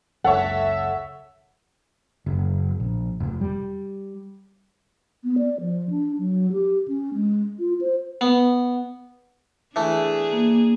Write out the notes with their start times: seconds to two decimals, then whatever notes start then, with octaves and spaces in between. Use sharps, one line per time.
0.24 F#1 C#2 A4 C#5 E5 F#5
2.26 F#1
2.80 A#1
3.20 F1
3.41 G3
5.24 B3
5.38 D5
5.61 F3
5.90 D4
6.18 F#3
6.52 G4
6.88 C#4
7.14 G#3
7.59 F4
7.81 C5
8.21 B3
9.76 E3 A3 D4 G#4
10.33 A#3